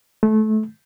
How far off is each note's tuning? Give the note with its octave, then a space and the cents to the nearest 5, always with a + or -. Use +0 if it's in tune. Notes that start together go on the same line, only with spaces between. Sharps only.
A3 -25